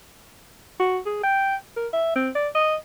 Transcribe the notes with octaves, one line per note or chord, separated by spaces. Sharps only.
F#4
G#4
G5
A#4
E5
C4
D5
D#5